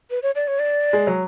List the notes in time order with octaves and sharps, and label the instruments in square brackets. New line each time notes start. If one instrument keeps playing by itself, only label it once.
[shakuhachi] B4
C#5
D5
C#5
D5
[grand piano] G#3
F#3